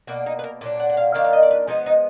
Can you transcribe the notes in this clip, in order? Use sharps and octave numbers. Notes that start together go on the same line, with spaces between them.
B2 A#3 D4 F#4
D#4
B4
A#4
A#2 F#3 D4
F#5
F#5
F5
D#3 A#3 D4 F5
F5
D#5
D5
B4
F3 G#3 B3 D#4
D#4